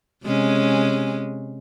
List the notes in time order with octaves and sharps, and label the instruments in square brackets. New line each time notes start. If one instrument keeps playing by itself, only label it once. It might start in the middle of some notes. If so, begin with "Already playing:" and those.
[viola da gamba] C3 G#3 C#4